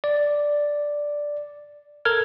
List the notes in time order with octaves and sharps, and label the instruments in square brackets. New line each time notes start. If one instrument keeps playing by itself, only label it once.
[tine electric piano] D5
A4 A#4 F6 G#6